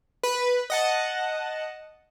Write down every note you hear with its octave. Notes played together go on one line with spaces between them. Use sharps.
B4
D#5 F#5 A5